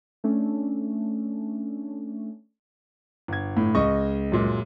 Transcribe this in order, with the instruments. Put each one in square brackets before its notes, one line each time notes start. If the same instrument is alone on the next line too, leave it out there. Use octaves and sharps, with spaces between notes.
[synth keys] A3 C#4 D4
[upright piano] G1 G#6
[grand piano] A2
[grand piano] C#2 [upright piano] D#5 C#6
[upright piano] F#2 A#2 G#3